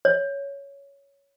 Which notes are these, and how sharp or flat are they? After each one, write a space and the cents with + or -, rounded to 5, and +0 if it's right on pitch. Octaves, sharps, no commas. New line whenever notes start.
C#5 +10